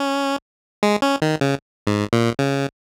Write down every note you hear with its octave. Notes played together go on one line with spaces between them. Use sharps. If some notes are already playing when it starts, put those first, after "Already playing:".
Already playing: C#4
G#3
C#4
D#3
C#3
G#2
A#2
C#3